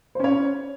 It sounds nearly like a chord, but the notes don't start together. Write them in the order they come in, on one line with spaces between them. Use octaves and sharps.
C5 C#4 C#5